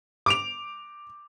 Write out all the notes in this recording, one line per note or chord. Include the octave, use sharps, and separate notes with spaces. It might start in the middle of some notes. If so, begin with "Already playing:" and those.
D6 D7 F7